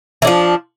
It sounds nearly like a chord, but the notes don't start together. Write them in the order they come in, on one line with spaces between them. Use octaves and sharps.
E3 D4 F3